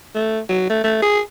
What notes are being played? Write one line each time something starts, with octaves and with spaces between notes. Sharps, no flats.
A3
F#3
A3
A3
G#4